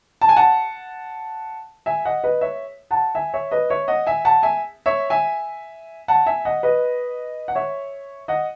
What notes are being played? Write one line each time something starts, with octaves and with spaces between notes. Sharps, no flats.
A5
G#5
F#5 A5
E5 G#5
D#5 F#5
B4 D#5
C#5 E5
F#5 A5
E5 G#5
C#5 E5
B4 D#5
C#5 E5
D#5 F#5
E5 G#5
F#5 A5
E5 G#5
C#5 E5
E5 G#5
F#5 A5
E5 G#5
D#5 F#5
B4 D#5
F#5
C#5 E5
D#5 F#5